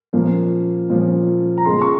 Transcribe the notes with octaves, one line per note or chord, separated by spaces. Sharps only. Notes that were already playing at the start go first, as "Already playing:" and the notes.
A#2 F3 A#3 C#4
A#2 F3 A#3 C#4
A#5
C#2 C#3 G#3 C#4 C6
C#6